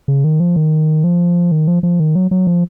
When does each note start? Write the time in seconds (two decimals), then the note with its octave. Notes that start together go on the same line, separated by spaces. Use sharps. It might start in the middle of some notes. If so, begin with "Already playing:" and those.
0.08 C#3
0.24 D#3
0.40 F3
0.56 D#3
1.04 F3
1.52 D#3
1.68 F3
1.83 F3
2.00 D#3
2.15 F#3
2.31 F#3
2.47 F3